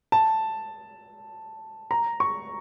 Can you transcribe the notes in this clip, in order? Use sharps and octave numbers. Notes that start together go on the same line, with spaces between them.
A5
A#5
C#6